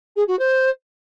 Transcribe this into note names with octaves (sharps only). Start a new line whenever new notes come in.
G#4
F#4
C5